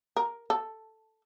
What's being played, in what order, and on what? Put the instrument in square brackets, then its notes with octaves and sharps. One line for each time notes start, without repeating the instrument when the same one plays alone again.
[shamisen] A#4
A4